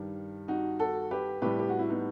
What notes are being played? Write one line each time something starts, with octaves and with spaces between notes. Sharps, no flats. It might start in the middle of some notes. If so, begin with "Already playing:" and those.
Already playing: G2 D#3 G3
D#4 F#4
F#4 A4
G4 B4
A2 G3 G4 B4
G4
F#4
E4
B3 D#4